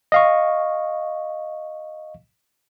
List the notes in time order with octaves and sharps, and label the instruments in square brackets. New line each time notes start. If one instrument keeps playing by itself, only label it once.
[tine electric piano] D#5 F5 C#6